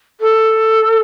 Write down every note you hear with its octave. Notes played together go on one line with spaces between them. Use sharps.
A4